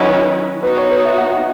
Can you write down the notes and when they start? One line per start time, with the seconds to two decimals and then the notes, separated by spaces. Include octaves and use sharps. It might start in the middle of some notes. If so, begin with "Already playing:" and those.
Already playing: D#3 F#3 C#4 E4 B4 C#5 D#5 F#5
0.63 B3 D#4 F#4 B4
0.77 C#5
0.91 B4
1.05 E5
1.18 F#5
1.31 F#5